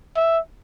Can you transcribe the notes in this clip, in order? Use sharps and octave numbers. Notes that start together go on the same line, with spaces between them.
E5